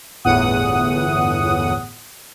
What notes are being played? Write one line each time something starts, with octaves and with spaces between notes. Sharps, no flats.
G1 E2 A2 F#5 D#6